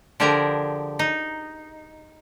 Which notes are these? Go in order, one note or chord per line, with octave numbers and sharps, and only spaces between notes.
D3 F3 G4 G#4 A#4 A#5
D#4